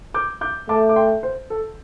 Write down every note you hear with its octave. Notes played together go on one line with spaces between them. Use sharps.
D6 G6
D6 G6
A3 A5 D6
D6
G5 C6
C5
A4